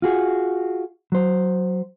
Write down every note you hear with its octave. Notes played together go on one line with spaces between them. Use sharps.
F4 F#4 G#4
F#3 C5